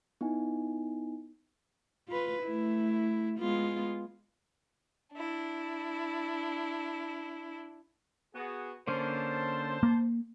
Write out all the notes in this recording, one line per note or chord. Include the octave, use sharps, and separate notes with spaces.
B3 D#4 E4 G#5
F4 B4
A3 E4
G#3 B3 F4
D4 E4
B3 F#4 G#4
D3 A#3 C#4 C5 A5
A#3